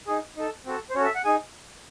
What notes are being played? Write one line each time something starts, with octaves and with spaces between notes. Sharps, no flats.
D#4 G#4
D#4 A4
C4 F#4 A4
C5
C#4 F#4 A4 C#5
E5
F#5
D#4 G#4 G#5